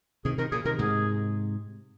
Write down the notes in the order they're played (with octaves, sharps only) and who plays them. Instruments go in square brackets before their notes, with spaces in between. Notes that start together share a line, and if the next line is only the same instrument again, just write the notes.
[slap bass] C3 D#3 [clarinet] G#4
[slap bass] C3 D#3 [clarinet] A#4
[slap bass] A#2 C#3 [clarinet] G#4
[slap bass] C3 D#3 [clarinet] A#4
[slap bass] G#2 C3 [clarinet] G#4